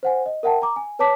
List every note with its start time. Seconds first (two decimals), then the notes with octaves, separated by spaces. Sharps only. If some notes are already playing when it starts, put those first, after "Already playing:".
0.03 C5 F#5 G#5
0.26 D#5
0.43 A#4 E5 F#5 G5 A5
0.62 A#5 D6
0.76 G#5
0.99 B4 C#5 A5 D6 B6